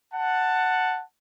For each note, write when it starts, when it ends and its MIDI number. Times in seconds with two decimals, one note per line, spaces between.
0.13 1.01 78
0.13 1.01 81